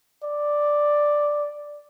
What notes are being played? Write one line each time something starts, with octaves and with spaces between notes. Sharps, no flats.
D5